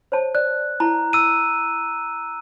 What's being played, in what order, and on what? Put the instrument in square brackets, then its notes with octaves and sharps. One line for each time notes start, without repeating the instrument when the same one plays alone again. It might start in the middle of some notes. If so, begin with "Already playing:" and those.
[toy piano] C5 C#5 A5
[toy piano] D5 [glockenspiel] F#6
[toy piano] E4 A5 [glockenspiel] A#5
[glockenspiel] E6 D#7